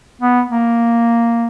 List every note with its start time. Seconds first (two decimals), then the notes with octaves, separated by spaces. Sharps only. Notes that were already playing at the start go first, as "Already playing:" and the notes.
0.21 B3
0.50 A#3